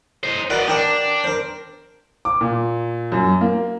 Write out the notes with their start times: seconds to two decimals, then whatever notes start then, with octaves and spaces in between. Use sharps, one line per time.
0.23 C5 D#5
0.50 F#4 A#4 B4 D5 D#5
0.68 D4 G4 A#4 C#6
1.24 A#4 C5
2.25 D6
2.41 A#2
3.12 F#2
3.41 A#3